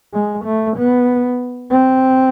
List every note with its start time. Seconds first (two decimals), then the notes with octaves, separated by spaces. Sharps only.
0.13 G#3
0.45 A3
0.77 B3
1.71 C4